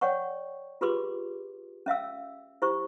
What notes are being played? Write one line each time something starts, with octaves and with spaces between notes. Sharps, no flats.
C#5 D5 F#5 G5 C#6
F4 G4 G#4 B4 C6 D6
C#4 E5 F5 E6
E4 G4 C5 C#6